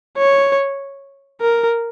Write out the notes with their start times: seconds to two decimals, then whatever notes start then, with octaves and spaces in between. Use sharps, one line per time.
0.18 C#5
1.42 A#4